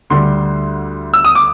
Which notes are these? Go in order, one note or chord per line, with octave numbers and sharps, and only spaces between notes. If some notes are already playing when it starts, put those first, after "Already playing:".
D2 D3 G3 C6
E6
D#6
D6